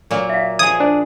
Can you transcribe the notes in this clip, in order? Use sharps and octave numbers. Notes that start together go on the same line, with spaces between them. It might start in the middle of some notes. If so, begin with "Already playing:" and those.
A#2 F#3 A#3
E5 F5
F3 G#4 D#6 G#6
D4 C5